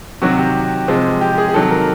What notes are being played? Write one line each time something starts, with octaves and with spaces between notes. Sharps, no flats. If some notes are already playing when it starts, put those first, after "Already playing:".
C3 D#3 F#3 F#4
G4
C3 F3 G#3
G4
G4
G#4
G#4
C3 D#3 F#3 A4
A#4